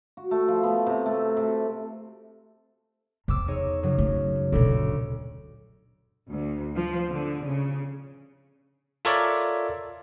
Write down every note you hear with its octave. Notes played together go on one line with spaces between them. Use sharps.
F#4
A3
F3
B3
C3
A3
C3
E2 C3 D6 E6
D#4 G#4 C#5
F#2 C#3 F#3
A3
E1 D2 A#2 D7
D2
F3
D3
C#3
F4 A4 A#4 C#5 D5 E5